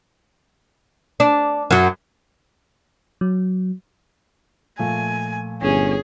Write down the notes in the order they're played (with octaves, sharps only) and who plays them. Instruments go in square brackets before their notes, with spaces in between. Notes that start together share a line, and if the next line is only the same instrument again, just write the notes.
[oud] D4
F#2 F#3
[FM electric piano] F#3
[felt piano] A#2 F3 A3 [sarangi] G#5
[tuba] G1 [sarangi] C#4 [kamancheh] G#4